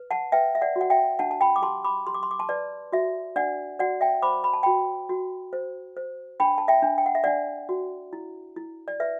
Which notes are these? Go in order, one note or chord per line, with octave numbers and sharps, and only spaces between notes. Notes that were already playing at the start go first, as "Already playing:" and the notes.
Already playing: B4
F#5 A5
B4 E5 G5
E5
D5 F#5
F#4
F#5
E5 G5
D4 F#5 A5
A5
G5 B5
D6
G4 A5 C6
B5 D6
G4 C6
D6
C6
D6
A5 C6
B4 D5
F#4 E5
D4 D5 F#5
F#4 D5 F#5
E5 G5
C5 B5 D6
B5
A5
F#4 G5 B5
F#4
C5
C5
D4 G5 B5
A5
E5 G5
D4
G5
F#5
E5
D4 D5 F#5
F#4
E4
E4
D5
B4 E5